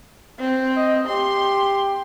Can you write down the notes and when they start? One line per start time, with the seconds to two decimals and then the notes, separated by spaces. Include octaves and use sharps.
0.40 C4
0.76 D#5
1.08 G4 C6